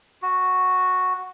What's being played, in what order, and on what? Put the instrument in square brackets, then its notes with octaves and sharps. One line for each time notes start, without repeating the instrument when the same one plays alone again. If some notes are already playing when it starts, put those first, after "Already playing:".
[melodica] F#4